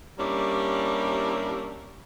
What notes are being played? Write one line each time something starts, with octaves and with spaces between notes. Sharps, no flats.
G3 A#3 C#4 D4 E4 G4